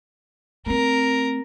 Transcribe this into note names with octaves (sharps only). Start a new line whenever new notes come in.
A3 C4 A#4